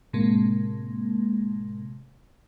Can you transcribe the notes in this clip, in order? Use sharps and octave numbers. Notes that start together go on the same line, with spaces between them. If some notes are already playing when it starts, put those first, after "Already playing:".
A2 C3 G#3 A#3